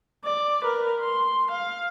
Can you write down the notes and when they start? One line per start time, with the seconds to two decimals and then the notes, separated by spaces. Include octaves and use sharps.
0.25 D5
0.64 A#4 B4
1.00 C6
1.51 F5